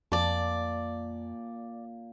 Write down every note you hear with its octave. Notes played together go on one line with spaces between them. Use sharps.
F2 A#2 D5 A5